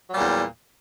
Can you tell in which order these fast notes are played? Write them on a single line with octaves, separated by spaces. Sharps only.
F#3 G3 A#2 E2